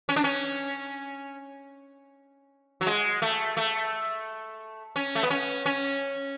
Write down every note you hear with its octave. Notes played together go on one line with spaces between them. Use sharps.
C#4
D4
C#4
F#3
G#3
A3
A3
C#4
A3
B3
C#4
C#4